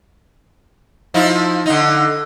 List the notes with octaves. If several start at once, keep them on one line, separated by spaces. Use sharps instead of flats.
F3 D#4 E4
D3 D#4